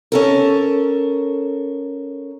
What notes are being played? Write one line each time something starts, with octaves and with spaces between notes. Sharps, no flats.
C#4 A4 A#4